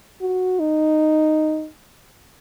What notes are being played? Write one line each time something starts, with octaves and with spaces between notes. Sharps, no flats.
F#4
D#4